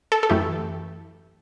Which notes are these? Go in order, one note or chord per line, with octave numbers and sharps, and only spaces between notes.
A4
A4
F#2 E3 A3 G4